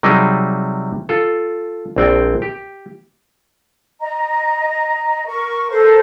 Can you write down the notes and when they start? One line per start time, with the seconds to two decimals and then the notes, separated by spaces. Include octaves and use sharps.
0.03 C3 F#3 G3 D#4 G4 G#4
1.09 F4 A4
1.96 A#1 C4 D5 G5
2.42 G4
4.00 D#5 A#5
5.26 A#4 C#6
5.71 A4 A#4 C5